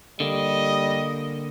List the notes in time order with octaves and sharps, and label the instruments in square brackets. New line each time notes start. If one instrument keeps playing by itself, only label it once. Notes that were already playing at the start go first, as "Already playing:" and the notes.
[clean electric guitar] D3 A#3 [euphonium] G3 [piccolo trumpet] D#5